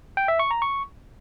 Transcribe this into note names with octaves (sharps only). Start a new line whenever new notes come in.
G5
E5
C#6
A#5
C#6